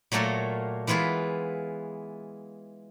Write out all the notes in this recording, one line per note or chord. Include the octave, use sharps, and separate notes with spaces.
A#2 F#3 A3 A#3 A4
E3 G#3 B3 E4 F4